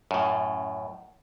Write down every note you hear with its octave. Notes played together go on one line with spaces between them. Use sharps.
F#2 A2